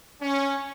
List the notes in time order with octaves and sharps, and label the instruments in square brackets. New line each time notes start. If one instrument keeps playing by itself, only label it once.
[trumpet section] C#4